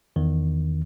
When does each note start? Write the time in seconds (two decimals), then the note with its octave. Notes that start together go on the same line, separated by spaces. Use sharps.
0.16 E2 D#3